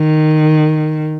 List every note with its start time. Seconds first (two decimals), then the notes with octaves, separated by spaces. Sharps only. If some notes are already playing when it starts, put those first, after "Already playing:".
Already playing: D#3